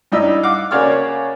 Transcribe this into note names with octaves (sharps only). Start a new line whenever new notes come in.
G2 G3 D#4 E4 E6
F5 F#5 D6
C#3 A#3 F#4 C#5 D5 F6